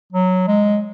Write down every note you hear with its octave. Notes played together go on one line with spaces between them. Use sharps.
F#3
G#3